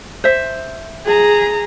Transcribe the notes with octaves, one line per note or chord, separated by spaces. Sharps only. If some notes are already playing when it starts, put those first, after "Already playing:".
C5 E5
G#4 A#5